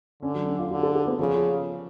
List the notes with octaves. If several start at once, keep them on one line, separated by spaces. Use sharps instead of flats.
D3 C#4
F#3
C#4
F4
D3 F#4
A4
A4
B3
C#3 F3